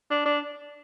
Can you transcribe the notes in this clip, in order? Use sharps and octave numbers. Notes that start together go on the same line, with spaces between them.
D4
D4